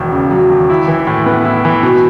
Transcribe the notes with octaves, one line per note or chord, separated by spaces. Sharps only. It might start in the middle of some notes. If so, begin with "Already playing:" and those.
Already playing: E1 D#2 F#3
C#3
F#3
D#2
E4
E3
A2
B3
E4
E3
B2